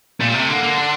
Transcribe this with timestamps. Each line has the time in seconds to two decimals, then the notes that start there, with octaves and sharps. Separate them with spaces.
0.21 A#2 A3
0.29 C3 G3
0.39 A3
0.49 D3 A#3
0.63 A#3
0.76 D4